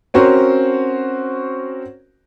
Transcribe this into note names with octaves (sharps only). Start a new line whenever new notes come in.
C4 C#4 F#4 A#4 C5